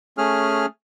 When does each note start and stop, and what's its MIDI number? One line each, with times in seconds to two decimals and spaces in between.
0.18 0.66 57
0.18 0.66 61
0.18 0.66 68
0.18 0.66 89